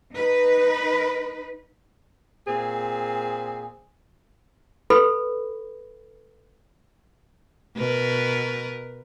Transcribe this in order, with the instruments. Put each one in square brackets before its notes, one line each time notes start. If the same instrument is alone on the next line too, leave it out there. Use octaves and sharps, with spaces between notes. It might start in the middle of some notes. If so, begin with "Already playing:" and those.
[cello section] D#4 B4
[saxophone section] A#2 C4 G#4
[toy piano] A4 B4 B5
[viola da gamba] B2 A#4 B4